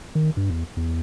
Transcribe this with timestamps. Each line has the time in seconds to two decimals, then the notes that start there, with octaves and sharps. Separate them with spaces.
0.15 D#3
0.37 G2
0.50 E2
0.77 E2